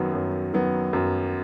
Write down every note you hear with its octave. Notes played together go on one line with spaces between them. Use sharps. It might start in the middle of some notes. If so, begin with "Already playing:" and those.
Already playing: F#2 D#3 F#3 B3
F#2
D#3 F#3 B3
F#2